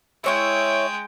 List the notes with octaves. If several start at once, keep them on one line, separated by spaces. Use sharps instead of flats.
G#3 E4 C#5 E5 G5